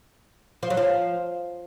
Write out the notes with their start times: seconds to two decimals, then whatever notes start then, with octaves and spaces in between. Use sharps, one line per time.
0.63 F3
0.70 F#3
0.77 F3